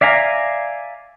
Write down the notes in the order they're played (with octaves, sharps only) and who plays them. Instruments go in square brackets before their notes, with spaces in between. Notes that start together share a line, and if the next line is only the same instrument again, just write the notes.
[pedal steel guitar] D5 E5 F5 G#5 A#5